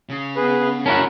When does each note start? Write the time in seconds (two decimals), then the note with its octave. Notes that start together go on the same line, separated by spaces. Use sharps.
0.09 C#3
0.36 B3 G#4 B4
0.86 C#4 E4 F#4 A#4 A5